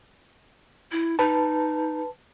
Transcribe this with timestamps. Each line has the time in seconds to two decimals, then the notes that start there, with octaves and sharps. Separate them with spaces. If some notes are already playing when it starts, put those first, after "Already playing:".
0.92 E4
1.19 D#4 B4 A5